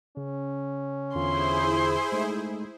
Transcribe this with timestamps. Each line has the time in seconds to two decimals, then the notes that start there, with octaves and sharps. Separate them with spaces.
0.17 C#3 C#4
1.15 E2 D3 E4 F4 G#4 C5 C6
2.12 G#3 A3 D#4